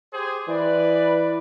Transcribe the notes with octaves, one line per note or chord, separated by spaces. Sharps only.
G4 G#4 C5
E3 B4 D5